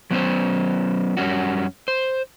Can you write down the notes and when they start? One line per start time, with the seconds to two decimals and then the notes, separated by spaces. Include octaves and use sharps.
0.11 F#3 B3 C#4 C5
1.17 F#2 G3 C#4 F#4
1.88 C5